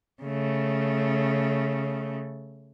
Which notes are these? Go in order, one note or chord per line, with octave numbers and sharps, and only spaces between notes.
C#3 A3